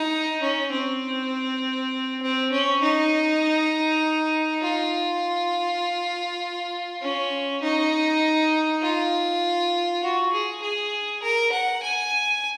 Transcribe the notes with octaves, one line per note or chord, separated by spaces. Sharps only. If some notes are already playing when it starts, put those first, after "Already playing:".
Already playing: D#4
C#4
C4
C4
C#4
D#4
F4
C#4
D#4
F4
F#4
G#4
G#4
A#4
F#5
G#5